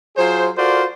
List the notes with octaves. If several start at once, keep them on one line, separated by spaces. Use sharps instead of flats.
F#3 F4 G#4 C5
F4 F#4 A4 A#4 C5 D5